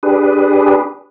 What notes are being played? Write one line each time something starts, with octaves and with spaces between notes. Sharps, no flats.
D4 G4 G#4 B4